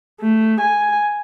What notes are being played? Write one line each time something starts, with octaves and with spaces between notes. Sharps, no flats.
A3
G#5